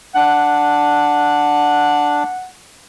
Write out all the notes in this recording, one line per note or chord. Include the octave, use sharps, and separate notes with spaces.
D4 F#5